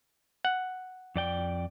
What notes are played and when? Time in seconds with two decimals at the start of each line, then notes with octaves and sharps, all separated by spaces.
0.45 F#5
1.16 F2 D5 G5